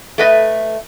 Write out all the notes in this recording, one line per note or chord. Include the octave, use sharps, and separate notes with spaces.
A3 B4 D#5